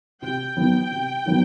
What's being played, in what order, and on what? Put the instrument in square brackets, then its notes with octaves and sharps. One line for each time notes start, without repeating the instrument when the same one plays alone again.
[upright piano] C3 [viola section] G5
[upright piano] D#3 F#3 B3
C3
D#3 F#3 B3